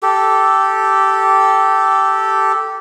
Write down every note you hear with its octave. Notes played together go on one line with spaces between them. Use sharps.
G4 A4